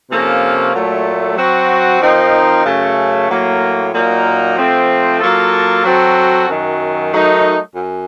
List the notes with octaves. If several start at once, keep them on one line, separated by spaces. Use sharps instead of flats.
C3 F3 A#3 C#4 A4
A#2 F#3 A3
F#3 C4 F#4
F3 C4 D#4 A#4
F#2 C#3 A3
A2 F#3 A#3
A#2 F#3 A#3 D#4 A#4
F3 A3 C4
F#3 A#3 F4 A4
F#3 C4 F#4 A4
F#2 D#3 F#3
F#3 A3 D#4 A#4
F#2